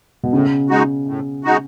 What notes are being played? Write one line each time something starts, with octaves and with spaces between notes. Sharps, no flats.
B2
A2 C#3
G#3 D#4 F#4
A2
G#3 D#4 F#4